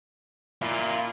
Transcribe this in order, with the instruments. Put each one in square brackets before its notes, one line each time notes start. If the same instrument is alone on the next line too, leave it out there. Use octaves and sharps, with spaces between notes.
[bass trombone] A#2 [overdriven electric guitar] E4 F4